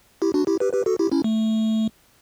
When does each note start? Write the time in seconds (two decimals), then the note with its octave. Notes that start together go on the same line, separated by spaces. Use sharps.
0.22 E4 G4
0.34 D4 F#4
0.47 E4 G4
0.60 G4 B4
0.73 G4 B4
0.86 F#4 A4
0.99 E4 G4
1.12 C#4 E4
1.24 A3